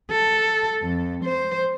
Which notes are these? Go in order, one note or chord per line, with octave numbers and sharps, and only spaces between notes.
A4
F2
C5